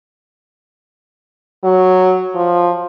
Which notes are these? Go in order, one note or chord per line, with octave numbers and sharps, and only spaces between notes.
F#3
F3